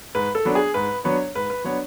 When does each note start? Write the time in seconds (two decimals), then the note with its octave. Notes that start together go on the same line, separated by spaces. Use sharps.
0.15 G#2 B4
0.35 A4
0.45 F#3 B3 D4
0.55 G#4
0.74 G#2 B4
1.04 F#3 B3 D4 C#5
1.35 G#2 B4
1.50 B4
1.64 F#3 B3 D4 C#5